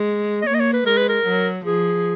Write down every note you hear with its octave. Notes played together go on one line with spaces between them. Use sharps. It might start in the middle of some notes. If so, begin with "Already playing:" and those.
Already playing: G#3
D#5
A#3 C#5
D#5
C#5
B4
G#3 A#4
B4
A#4
F#3
F3 G#4